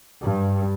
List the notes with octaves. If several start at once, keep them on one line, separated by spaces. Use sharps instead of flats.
G2